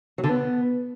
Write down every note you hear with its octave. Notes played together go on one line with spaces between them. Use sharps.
F#3
D3
B3